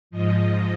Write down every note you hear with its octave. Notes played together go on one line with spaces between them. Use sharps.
G#2 F3 D#5